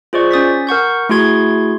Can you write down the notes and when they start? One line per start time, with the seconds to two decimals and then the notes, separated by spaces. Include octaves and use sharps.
0.13 F4 G#4 C5 D5 D#5 C#6
0.31 C#4 D#6 A6 B6
0.67 A#4 F#5 C#6 G6
1.09 A3 E4 F#4 G#4 C6 G#6